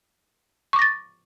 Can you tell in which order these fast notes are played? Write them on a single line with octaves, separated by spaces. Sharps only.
C#6 D6 A#6 A6